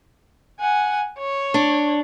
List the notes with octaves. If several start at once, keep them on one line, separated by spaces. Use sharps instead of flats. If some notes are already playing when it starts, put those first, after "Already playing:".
F#5 G#5
C#5
D4